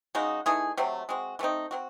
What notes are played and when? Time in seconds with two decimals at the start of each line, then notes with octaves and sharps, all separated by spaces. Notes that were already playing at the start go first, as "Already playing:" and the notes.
0.15 C#3 G#3 D#4 F#4
0.46 E3 A3 D#4 G#4
0.77 C3 F#3 A3 C4
1.09 G#3 C4 F#4
1.39 E3 A3 C4 D#4
1.71 F#3 C4 F#4